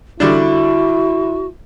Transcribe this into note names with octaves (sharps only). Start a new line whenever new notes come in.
D3 G3 D4 E4 F#4